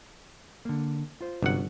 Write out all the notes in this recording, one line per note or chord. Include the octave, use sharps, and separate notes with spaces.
D3 A#3
F4 C5
G1 C3 F#3 C#4 F#5